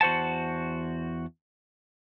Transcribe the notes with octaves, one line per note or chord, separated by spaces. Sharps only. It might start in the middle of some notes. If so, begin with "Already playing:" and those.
E2 F#4 C5 F#5 A5